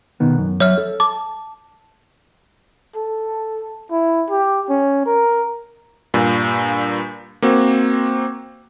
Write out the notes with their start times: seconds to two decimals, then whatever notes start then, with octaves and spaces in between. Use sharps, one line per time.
0.20 B2 D#3 B3
0.38 F#2
0.60 F#3 C#5 E5 F6
0.78 A4
1.00 A5 D6
2.96 A4
3.91 E4
4.31 G4
4.69 C#4
5.06 A#4
6.14 G2 A#2
7.42 A#3 C4 F#4